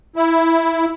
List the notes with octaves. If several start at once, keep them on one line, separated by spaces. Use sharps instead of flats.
E4